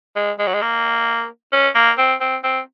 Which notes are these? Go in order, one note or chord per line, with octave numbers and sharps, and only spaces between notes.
G#3
G#3
F#3
G#3
A#3
C#4
A#3
C4
C4
C4